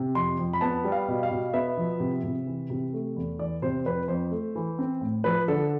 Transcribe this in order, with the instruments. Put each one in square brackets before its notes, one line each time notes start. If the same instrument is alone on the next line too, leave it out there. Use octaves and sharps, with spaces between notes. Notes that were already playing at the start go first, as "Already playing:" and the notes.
Already playing: [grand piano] C3
F2 C6
F2
B5
B3 A5
G3
F5
B2
F5
B2
B3 E5
F3
C3
C3
E3
C3
A3
E2
E3 D5
C3 C5
F2 B4
F2 C5
A3
E3
C4
A2
F3 B4
D3 A4